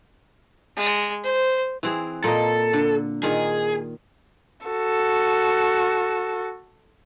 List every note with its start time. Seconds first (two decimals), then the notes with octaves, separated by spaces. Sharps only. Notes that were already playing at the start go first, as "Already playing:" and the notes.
0.77 G#3
1.24 C5
1.83 E3 C4 G#4
2.24 A#2 A#3 A4 D#5
2.73 D3
3.23 A#2 D#3 G#4
4.67 F#4 A4